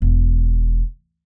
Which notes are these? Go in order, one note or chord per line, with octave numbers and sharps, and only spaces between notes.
E1